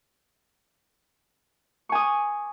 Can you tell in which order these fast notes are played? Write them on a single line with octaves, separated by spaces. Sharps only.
C#6 G#5 D#6